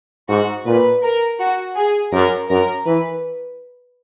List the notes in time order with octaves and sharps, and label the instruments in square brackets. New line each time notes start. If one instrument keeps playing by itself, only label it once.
[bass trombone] G#2 [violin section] F#4
[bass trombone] A#2 [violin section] B4
[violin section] A#4
F#4
G#4
[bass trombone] F#2 [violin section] A#4
[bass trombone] F#2 [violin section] A#4
[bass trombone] E3 [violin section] B4